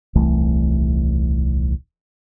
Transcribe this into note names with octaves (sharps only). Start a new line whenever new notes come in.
D#1 C2 E3 A3